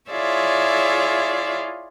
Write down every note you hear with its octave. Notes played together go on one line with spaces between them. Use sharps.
E4 F4 G#4 C#5 D5 E5